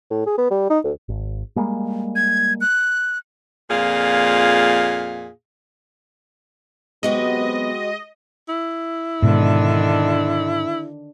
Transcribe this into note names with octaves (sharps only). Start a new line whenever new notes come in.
A2
G#4
B3
G3
D#4
D2
G#1
G3 G#3 A#3
G#6
F#6
F2 A#2 G#4 F5
C3 F#3 G#3 B3 F#4 G4 D#5
E4
G#2 B2 D3 D#3 D4